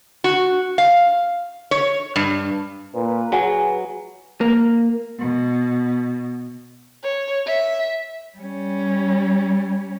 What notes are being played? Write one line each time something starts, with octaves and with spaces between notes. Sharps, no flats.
F#4
F5
C#5
G2
A#2 B4
F#3 F#4 G#4 F#5 G#5
A#3
B2
C#5
E5
G3 C#4